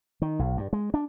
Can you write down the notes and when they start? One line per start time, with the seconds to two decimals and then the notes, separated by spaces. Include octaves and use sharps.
0.22 D#3
0.39 B1
0.57 G2
0.73 G#3
0.94 D4